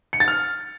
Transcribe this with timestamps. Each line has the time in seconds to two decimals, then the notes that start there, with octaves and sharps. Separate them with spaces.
0.13 C#7
0.20 A6
0.28 F6